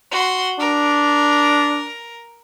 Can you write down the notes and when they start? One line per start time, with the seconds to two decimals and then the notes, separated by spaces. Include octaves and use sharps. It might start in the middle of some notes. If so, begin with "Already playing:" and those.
0.11 F#4 C6
0.59 D4 A#4